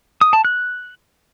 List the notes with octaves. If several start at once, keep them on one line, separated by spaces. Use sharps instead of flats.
D#6
A5
F#6